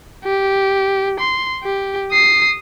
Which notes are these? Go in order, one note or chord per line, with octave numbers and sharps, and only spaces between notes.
G4
C6
G4
D#6 C7